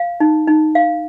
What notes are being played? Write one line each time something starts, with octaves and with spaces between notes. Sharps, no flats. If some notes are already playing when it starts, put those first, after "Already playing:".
Already playing: F5
D#4
D#4
F5